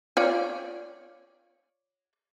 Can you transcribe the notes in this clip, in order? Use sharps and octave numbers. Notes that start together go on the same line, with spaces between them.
F4 C#5 D5